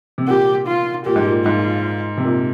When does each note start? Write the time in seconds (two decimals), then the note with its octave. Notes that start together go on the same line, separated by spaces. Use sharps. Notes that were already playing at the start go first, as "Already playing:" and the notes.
0.18 C3
0.28 A#2 G4
0.67 F4
1.06 A#2 G4
1.16 G#2
1.26 A#2
1.45 G#2 F4
2.17 C3
2.24 A#2